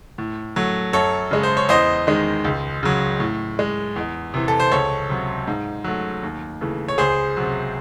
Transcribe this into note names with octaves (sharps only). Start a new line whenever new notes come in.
A2
F#3 A3
F#2 A4 C#5
C#3 G#3
C5
C#5
E2 C5 D#5
D#3 G#3
C#2
C#3 F#3
A2
G#3
E2
C3 E3
A4
C5
C#2 A4 C#5
C3 F#3
G#2
F#3 A3
D#2
C#3 E3 A3
C#5
C#2 G#4 C5
C3 F#3